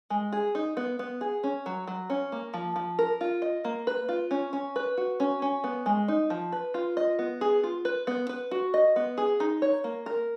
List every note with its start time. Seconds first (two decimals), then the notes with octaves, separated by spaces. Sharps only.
0.10 G#3
0.33 G#4
0.55 D#4
0.77 B3
0.99 B3
1.21 G#4
1.44 C#4
1.66 F#3
1.88 F#3
2.10 C#4
2.32 A#3
2.54 F3
2.76 F3
2.99 A#4
3.21 F4
3.42 D#5
3.65 A#3
3.87 B4
4.09 F4
4.31 C#4
4.53 C#4
4.76 B4
4.97 F#4
5.20 C#4
5.42 C#4
5.64 B3
5.86 G#3
6.08 D#4
6.30 F3
6.52 B4
6.74 F4
6.97 D#5
7.19 B3
7.41 G#4
7.63 F4
7.85 B4
8.07 B3
8.29 B4
8.51 F#4
8.74 D#5
8.96 B3
9.18 G#4
9.40 D#4
9.62 C#5
9.84 A#3
10.06 A#4